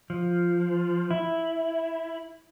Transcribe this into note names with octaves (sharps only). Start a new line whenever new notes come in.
F3
E4